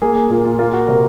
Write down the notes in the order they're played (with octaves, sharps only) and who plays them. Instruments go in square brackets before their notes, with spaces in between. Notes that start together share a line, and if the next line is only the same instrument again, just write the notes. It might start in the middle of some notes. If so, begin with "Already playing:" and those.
[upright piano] A#3 G#4
G#4
A#2 A#4
F4
A#3 F4
F#4
C3 A#4